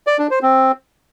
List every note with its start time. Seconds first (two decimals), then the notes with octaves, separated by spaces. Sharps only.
0.07 D5
0.19 D4
0.31 C5
0.43 C4